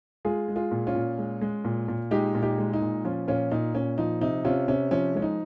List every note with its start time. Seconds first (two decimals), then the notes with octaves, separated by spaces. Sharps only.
0.25 G#3 F4 G#4
0.48 G#3
0.56 F4 G#4
0.71 A#2
0.87 C#4 F4
0.95 A#2
1.18 G#3
1.41 G#3
1.65 A#2
1.88 A#2
2.11 G#3 D#4 G4
2.35 A#2
2.43 D#4 G4
2.58 G#3
2.73 D#4
2.81 A#2
3.05 F3 C#4 F4
3.28 A#2 C#4 F4
3.51 A#2 D#4
3.75 A#2 C#4
3.98 F3 D#4
4.21 C3 D#4
4.44 C3 C#4 F4
4.68 C3 C#4
4.91 F3 C#4
5.15 G#3 C#4
5.22 D#4